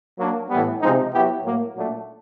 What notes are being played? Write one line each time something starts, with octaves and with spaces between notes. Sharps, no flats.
F#3 A#3 D4
A2 E3 G3 B3
C3 F3 G#3 C4 D#4
F#3 B3 E4 G4
A2 F#3 A#3
A#2 F#3 A3 D4